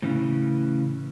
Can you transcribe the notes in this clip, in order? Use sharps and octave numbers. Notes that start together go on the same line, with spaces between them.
A2 C#3 E3 C#4